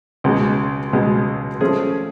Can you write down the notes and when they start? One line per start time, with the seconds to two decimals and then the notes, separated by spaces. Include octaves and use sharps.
0.24 C#2 B2 G#3
0.93 C#2 B2 G#3
1.61 F3 A3 C#4 G#4